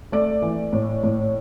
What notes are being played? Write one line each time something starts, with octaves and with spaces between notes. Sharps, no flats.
A3 D5
E3
A2
A2